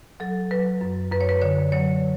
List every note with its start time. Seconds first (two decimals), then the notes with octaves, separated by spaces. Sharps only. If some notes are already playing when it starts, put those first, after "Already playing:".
0.20 F#3 A4
0.51 F#3 B4
0.81 F#2
1.11 F#2 B4
1.21 C#5
1.29 B4
1.42 D3 C#5
1.72 F#3 C#5